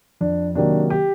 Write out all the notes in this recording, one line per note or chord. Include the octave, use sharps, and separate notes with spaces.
F2 D4
C3 D#3 F#3 A#3 D4
G4